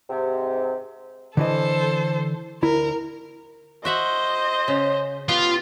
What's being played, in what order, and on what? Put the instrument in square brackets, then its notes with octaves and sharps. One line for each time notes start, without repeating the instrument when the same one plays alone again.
[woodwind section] G#2 C3
[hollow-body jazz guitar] D3 E3 D#5 [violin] A4 C5
[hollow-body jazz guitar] D2 E4 [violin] A#4
[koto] F#4 E5 F#5 [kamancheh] C5 D#5
[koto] C#3
[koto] B3 G4 [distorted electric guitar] F4